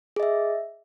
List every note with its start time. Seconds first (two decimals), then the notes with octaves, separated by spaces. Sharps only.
0.16 G#4
0.20 D#5
0.23 E5